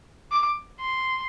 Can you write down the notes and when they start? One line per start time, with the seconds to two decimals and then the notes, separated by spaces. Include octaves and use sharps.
0.31 D6
0.80 C6